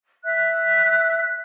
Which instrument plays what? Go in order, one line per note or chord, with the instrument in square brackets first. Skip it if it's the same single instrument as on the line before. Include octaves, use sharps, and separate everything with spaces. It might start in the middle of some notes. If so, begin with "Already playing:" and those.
[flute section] E5 F#6